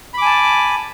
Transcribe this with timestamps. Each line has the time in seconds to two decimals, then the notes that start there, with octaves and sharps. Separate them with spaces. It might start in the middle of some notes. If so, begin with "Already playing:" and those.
0.14 B5
0.18 D6
0.22 G#5
0.26 A5